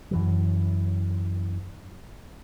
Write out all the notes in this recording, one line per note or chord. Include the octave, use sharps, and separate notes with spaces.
F#2 E3 F#3